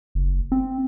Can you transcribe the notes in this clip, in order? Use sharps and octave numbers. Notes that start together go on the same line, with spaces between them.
F#1
C4